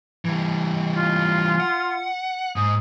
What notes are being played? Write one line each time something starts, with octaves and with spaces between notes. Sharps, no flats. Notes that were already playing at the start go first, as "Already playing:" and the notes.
E3 G3
F4
F#5
G#2 D#6